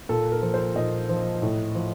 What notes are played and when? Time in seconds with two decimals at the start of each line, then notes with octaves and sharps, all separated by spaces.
0.09 A#2 A4
0.32 A#4
0.42 F3
0.54 C5
0.76 A#2 D#5
1.09 F3
1.42 A2
1.75 F3